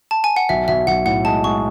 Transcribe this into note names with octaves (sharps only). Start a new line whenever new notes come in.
A5
G#5
F#5
B1 E5
B1 E5
B1 F#5
A2 F#5
G#3 A5
G#3 C#6